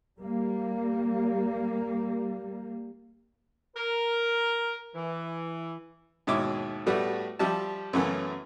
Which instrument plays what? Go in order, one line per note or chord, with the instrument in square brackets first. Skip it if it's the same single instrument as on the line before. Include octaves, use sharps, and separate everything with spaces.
[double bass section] G3 A#3
[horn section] A#4
E3
[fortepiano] D#2 G#2 B2 E4 C#5 D6
A2 G3 A3 B3 F#4
F3 G3 G4 E5 A5
F#2 C#3 E3 A3 B3 C#4